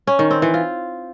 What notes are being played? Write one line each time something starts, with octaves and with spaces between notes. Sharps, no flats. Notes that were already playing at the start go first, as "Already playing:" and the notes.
C#4
D#3
C4
E3
F4